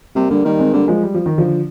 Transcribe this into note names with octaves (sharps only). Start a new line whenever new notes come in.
C3 G3 A#3
D3 G3 A#3
D#3 G3 A#3
G#3 C4
D3 G3 A#3
F3 G#3
G3
F3
D#3
D3 F3